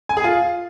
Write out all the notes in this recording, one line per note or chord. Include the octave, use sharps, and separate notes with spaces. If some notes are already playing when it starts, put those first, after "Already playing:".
G#5
G#4
F4